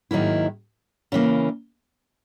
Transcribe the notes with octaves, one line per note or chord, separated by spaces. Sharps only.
G#2 D#3 F#3 A#3 E4
C#3 E3 A#3